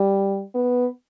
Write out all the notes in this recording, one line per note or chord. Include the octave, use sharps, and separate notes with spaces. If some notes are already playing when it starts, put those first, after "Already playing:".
Already playing: G3
B3